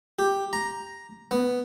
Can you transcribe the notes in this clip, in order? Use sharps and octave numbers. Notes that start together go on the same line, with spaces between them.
G4
A#5
B3